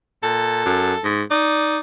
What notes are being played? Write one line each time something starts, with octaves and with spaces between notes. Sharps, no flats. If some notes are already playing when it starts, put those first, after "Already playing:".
A#2 A4
F#2
G#2
D#4 D5